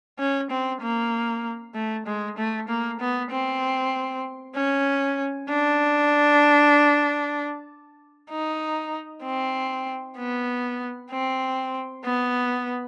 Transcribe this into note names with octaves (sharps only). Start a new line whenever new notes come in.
C#4
C4
A#3
A3
G#3
A3
A#3
B3
C4
C#4
D4
D#4
C4
B3
C4
B3